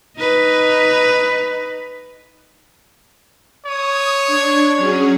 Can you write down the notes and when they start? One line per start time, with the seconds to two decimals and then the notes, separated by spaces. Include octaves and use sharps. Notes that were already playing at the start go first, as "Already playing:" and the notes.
0.17 D#4 B4
3.66 C#5 D#6
4.27 D4 G#6
4.76 F#3 C#4 G#4